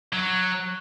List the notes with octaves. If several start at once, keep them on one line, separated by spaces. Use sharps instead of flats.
F#3